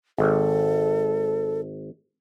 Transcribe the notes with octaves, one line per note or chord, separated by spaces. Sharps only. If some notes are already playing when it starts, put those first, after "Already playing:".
G#1 A4